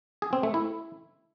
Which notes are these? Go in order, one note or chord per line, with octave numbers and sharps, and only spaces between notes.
G#4
C4
A3
E4